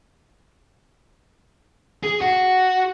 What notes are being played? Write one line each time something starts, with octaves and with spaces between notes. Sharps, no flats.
G#4
F#4